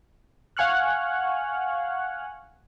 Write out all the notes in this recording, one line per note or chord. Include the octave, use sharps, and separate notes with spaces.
F5 F#5 G#5 C#6 F6 F#6